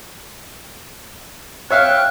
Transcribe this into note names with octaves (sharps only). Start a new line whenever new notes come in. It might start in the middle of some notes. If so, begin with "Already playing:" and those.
C#5 E5 F5 G5 F6 F#6